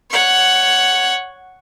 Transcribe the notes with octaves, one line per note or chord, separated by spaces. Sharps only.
C#5 F#5